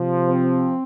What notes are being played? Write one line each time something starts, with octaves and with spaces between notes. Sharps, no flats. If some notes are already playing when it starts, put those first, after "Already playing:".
Already playing: C3 F3
C4